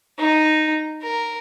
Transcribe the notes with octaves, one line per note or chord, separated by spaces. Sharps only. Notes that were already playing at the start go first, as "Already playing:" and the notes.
D#4
A#4